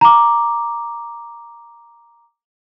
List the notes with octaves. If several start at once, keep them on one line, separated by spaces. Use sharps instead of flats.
A#5 D6